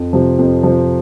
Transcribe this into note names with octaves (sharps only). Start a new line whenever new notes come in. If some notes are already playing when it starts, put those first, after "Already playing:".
Already playing: F2
C3 F3
F2
C3 F3